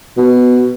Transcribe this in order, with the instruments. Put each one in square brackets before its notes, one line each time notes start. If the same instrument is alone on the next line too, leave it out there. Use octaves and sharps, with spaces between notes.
[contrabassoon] B2